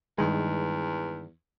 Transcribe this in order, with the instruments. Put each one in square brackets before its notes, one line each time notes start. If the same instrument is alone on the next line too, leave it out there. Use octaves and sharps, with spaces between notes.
[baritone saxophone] E2 [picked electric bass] G2 D#3 G#3